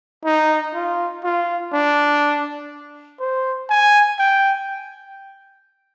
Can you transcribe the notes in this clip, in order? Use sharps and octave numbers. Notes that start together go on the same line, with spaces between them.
D#4
F4
F4
D4
C5
G#5
G5